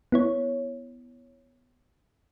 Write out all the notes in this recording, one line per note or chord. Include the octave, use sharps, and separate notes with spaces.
B3 E4 C#5